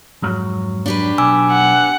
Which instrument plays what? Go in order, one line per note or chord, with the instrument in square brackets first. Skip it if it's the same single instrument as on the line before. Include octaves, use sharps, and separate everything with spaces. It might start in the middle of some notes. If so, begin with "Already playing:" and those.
[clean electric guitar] F2 G#2 F#3
[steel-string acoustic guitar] D4 G4 B4
[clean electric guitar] B1 [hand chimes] G#5 D6 E6
[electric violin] F#5